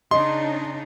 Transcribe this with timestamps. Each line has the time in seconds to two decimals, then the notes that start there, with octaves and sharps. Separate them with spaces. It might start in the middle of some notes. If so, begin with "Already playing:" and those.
0.11 C#3 D4 D#4 D#5 C6